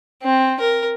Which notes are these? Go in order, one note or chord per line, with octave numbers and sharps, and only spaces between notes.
C4
A#4